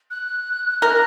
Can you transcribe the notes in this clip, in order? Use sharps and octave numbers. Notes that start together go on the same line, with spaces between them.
F#6
A#4